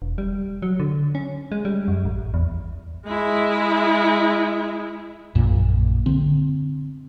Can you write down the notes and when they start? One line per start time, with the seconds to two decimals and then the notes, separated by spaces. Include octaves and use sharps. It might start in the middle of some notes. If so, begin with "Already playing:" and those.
0.02 E1
0.18 G3
0.62 F#3
0.80 D3
1.15 C#4
1.52 G#3
1.65 G3
1.88 F#2
2.05 A1
2.34 E2
3.07 G#3 E4
5.35 A#1 F#2 A#2
6.06 D3 C4